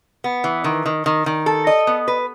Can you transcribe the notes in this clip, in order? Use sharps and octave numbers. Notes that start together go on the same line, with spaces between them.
B3
E3
D#3
D#3
D#3
D#3
A4
D#5
B3
B4